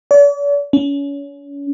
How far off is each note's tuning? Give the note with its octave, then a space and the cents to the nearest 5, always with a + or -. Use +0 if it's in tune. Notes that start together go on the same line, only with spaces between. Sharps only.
D5 -45
C#4 +30